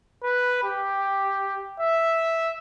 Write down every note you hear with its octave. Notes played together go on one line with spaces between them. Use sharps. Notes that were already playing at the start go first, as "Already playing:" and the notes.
B4
G4
E5